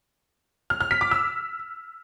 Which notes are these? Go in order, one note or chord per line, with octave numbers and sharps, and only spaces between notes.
F6
F6
B6
D6
E6